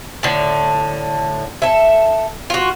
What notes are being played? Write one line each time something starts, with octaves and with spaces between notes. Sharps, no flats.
A2 D3
A4 E5
F4 F#4